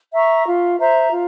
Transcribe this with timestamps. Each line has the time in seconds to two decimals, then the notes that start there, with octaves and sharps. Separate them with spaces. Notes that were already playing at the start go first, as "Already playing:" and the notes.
0.14 E5 A#5 C#6
0.46 F4
0.79 C5 E5 A#5
1.12 F4